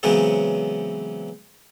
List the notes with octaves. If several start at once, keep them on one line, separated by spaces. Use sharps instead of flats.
C#3 E3 F#3 G#3 B3 C4